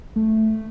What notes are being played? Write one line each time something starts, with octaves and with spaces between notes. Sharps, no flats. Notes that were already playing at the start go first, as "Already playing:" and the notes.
A3